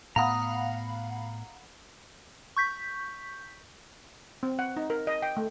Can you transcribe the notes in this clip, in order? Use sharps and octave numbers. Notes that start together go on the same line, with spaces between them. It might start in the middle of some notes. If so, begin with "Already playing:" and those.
A2 B3 F5 F#5 A#5 B5 D#6
C#6 G6 B6
C4
F#5
D#4
A#4
D#5
G5
A3